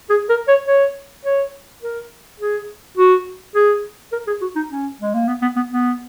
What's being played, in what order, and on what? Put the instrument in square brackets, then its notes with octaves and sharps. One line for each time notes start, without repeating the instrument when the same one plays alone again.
[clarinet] G#4
A#4
C#5
C#5
C#5
A#4
G#4
F#4
G#4
A#4
G#4
F#4
D#4
C#4
G#3
A#3
B3
B3
B3
B3